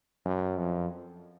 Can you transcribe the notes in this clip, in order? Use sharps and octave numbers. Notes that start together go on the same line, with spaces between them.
F#2
F2